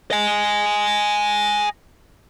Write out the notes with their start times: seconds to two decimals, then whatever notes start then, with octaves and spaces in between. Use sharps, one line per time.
0.11 D#5 G#5